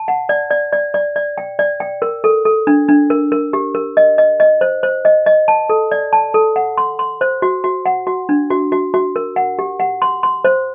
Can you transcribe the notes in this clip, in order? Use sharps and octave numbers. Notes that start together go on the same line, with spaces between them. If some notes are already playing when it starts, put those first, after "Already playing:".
Already playing: A5
F#5
D5
D5
D5
D5
D5
G5
D5
G5
A#4
A4
A4
D4
D4
A#4
A#4
G4
A#4
D#5
D#5
D#5
C5
C5
D#5
D#5
A5
A4
D5
A5
A4
F#5
C6
C6
C5
F#4
F#4
F#5
F#4
D4
F#4
F#4
F#4
A#4
F#5
G4
F#5
C6
C6
C5